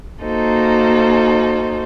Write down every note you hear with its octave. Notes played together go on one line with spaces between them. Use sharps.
A#3 D#4 F#4 A4 C5